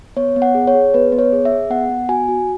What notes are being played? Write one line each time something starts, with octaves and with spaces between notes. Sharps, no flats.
B3 C#5
B3
F#5
G#4
C#5
G#4
B3 B4
B3
C#5
G#4
E5
G#4
B3 F#5
B3
F#4 G#5
F#4